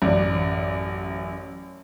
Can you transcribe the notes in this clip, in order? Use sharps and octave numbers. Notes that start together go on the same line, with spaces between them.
A1 F#2 D5